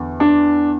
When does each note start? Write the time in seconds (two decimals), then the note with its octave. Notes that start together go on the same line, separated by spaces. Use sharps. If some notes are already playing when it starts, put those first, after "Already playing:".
Already playing: E2 D3
0.20 D4